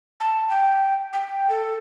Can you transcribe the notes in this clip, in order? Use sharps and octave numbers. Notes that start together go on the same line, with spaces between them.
A5
G5
G5
A4